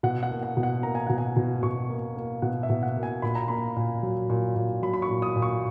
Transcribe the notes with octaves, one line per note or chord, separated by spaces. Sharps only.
B2 F#5
F#5
A#3
F#5
B2
F#5
A#3 A#5
G#5
B2 F#5
G#5
B2
B2 C#6
A#3
A#3
B2 F#5
E5
B2
F#5
A#3
G#5
A#2 B5
A#5
A#3 B5
A#2
F#3
A#2
A#2
F#3 B5
B5
C#6
A#2
D#6
A#2
C#6